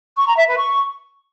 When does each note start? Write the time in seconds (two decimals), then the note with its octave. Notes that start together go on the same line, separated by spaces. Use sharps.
0.17 C#6
0.27 A#5
0.37 E5
0.47 B4
0.57 C#6